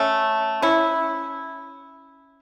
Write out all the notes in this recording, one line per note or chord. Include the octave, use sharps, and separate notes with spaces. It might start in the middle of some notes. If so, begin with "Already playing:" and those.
Already playing: A3 C#4
C#4 E4